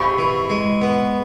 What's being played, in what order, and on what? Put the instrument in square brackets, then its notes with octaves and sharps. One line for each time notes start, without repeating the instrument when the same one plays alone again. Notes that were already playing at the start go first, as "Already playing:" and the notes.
Already playing: [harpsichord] C3 [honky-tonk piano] B5 C#6
[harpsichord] E3
G#3
B3